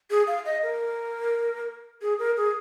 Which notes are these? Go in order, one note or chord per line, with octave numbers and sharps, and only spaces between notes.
G#4
F5
D#5
A#4
G#4
A#4
G#4